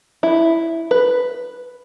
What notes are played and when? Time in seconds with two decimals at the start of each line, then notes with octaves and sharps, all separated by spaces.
0.23 E4
0.91 B4